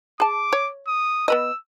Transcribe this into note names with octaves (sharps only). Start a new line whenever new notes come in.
G#4 A5 D6
C#5
D#6
B3 B4 D#5 E6